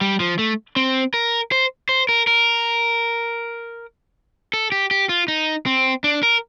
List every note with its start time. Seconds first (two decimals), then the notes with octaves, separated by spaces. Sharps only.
0.01 G3
0.20 F3
0.39 A3
0.76 C4
1.14 A#4
1.52 C5
1.89 C5
2.09 A#4
2.27 A#4
4.53 A4
4.72 G4
4.91 G4
5.09 F4
5.28 D#4
5.66 C4
6.04 D4
6.23 A#4